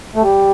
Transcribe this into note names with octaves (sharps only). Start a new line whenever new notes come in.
A3
G3